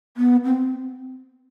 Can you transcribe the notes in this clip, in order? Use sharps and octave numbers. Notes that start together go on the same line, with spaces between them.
B3
C4